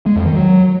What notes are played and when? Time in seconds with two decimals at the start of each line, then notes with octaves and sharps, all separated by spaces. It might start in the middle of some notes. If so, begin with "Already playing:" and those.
0.06 G#3
0.16 F2
0.26 D#3
0.36 F#3